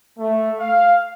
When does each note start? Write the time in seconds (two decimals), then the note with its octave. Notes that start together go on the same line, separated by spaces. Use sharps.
0.18 A3
0.59 F5